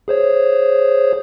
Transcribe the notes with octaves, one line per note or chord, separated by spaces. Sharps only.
G#4 C5 C#5